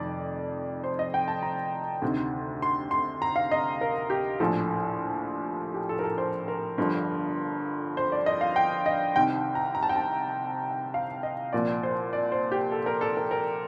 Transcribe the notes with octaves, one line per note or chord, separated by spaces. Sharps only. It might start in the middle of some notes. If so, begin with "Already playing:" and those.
Already playing: F1 F2 D#3 D5
C5
D#5
G5
A5
A#5
D2 C3 D#3
C6
C6
A#5
F5
D#5
A#4
G4
A#1 A2 F3 A4
G4
A4
A#4
A4
C5
A#4
G1 G2 D3 F3
C5
D5
D#5
F5
G5
D#5
C2 C3 D#3 G5
A#5
A#5
A5
G5
A5
F5
D#5
C2 A#2 F3 D5
C5
D5
C5
G4
A4
A#4
A4
A#4
A#4